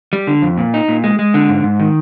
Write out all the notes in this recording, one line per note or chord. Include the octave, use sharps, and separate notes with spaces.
G3
D3
F2
A#2
D#4
A#2
G#3
G#3
D3
G#2
G#2
D#3